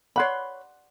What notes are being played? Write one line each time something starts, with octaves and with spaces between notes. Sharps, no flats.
C#5 D5 F#5 B5 C6